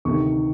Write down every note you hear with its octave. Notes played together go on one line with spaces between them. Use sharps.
D2 C3 D#3 C#6